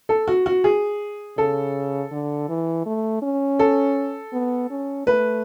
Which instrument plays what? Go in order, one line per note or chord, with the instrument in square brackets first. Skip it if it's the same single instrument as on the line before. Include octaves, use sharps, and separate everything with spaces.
[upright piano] A4
F#4
F#4
G#4
[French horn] C#3 [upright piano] A4
[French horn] D3
E3
A3
C#4
[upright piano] A4
[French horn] B3
C#4
[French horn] A3 [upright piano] B4